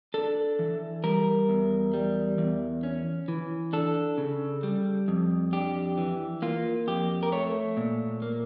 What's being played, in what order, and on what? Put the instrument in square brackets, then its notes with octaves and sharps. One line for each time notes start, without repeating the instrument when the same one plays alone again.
[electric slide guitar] D4 A4
E3
G3 A#4
E2
G3
E2
C#4
E3
D4 A4
C#3
G3
F2
D4 G4
E3
A#3 F4
F2 G4
A#4
A3 C#5
A#2
A#3